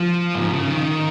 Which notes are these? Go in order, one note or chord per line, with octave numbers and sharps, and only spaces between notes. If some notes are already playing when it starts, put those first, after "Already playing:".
Already playing: F3
G#2
C#3
D#3